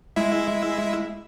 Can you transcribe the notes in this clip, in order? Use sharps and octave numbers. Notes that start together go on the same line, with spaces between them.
G#3 E4 E5